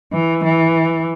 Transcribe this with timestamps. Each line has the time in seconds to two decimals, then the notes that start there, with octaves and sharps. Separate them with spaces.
0.13 E3
0.45 E3